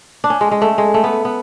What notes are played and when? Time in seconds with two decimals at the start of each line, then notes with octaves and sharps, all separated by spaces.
0.24 D4
0.30 C#4
0.41 G#3
0.51 G#3
0.62 A3
0.78 G#3
0.94 A3
1.04 B3
1.25 B3